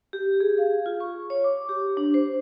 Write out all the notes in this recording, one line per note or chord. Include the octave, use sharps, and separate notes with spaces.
G4
G#4
F5
F4
C#6
C#5
D6
G4
D4
C5